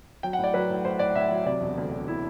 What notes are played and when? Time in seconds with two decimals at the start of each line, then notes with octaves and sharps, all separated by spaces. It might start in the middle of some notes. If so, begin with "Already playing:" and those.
0.23 F#3 G5
0.33 F#5
0.38 A2
0.44 D5
0.54 F#3 B4
0.70 A2
0.85 A2 C5
0.99 A2 D5
1.15 A2 E5
1.31 F#3
1.46 C3 D5
1.61 E1
1.77 D2
1.92 D2
2.08 E4